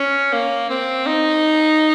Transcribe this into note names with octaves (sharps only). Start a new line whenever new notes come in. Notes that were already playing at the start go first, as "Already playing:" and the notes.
Already playing: C#4
A#3
C4
D#4